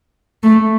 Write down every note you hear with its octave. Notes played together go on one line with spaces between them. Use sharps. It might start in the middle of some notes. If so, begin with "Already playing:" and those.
A3